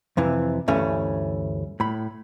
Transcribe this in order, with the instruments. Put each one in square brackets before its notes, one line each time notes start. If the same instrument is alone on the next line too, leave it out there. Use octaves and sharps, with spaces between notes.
[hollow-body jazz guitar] F2 C3 E3
D2 G2 E3 A3 C#4
A2 B5